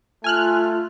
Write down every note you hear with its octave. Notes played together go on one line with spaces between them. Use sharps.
A3 F4 G#5 F6 F#6